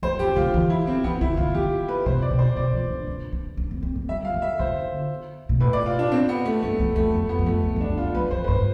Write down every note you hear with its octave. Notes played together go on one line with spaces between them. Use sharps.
E2 C5
F2 G4
D3 F4
E3
E4
C4
E3 B3
D3 E4
D3 F4
E3 G4
B4
C3 C5
D5
B2
C5
B2 D5
E3
D4
D4
D4
D4
C4
C4
B3
G3 E5
F5
E3
E5
D3 C5
B2
A2 B4
D5
F4
D4
C4
B3
A3
G2 A3
E2
E2 A3
F2
B3
F2
A3
F2
E2
D4
F2
F4
E2
F2 B4
F2 C5
B4
G2 C5